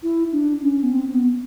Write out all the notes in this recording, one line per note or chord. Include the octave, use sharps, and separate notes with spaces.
E4
D4
C#4
B3
C4
C4
B3